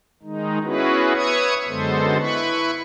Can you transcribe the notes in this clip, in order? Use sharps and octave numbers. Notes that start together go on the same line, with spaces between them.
D#3 G#3 D#4
B3 C#4 E4 F#4 G#4 B4
B4 C#5 E5 C#6 D#6 G#6
F#2 D3 G#3 B3 A4 C5
E4 B4 B5 C#6